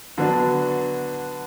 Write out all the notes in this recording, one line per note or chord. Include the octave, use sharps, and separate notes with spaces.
D3 F#3 B3 D4